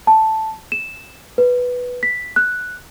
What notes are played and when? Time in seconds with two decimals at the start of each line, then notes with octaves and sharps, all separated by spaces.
0.07 A5
0.72 E7
1.38 B4
2.03 B6
2.36 F#6